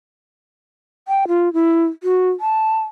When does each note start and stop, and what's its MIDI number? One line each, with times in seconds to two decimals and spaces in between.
1.08 1.28 79
1.28 1.52 65
1.54 1.85 64
2.03 2.30 66
2.40 2.79 81